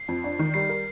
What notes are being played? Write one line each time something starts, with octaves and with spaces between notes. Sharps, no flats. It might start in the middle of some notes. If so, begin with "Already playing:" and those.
Already playing: C7
F2
D4
D#3
G3 C7
A#4